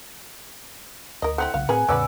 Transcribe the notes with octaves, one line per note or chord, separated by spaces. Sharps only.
D2 A#4 D#5
A3 C4 E4 F#5
B1 C#3 F5
A2 C4 G#4 A#4 B4 G#5
E2 A2 C#3 B3 C#4 B4 D5 E6